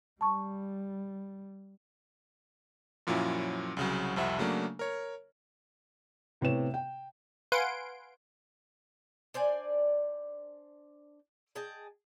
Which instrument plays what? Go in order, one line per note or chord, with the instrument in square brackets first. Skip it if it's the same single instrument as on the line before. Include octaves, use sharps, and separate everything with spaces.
[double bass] G3 [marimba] A5 C#6
[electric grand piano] F#2 A#2 F3 F#3 C#4 E4
C2 C#3 F#3
C2 F2 C3 E5 F#5
C#3 F#3 A3 A#3 D4
A#4 C#5
[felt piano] A2 C3 B3 C#5 E7
G5
[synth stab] B4 F5 F#5 G#5 C6 D7
[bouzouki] D4 C5 D5 G#5
G#4 D#5 G5 A5